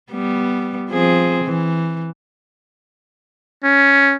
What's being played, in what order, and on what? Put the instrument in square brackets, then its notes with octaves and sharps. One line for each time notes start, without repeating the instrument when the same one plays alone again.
[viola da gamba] G3 B3
F3 C4 G#4
E3
[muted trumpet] C#4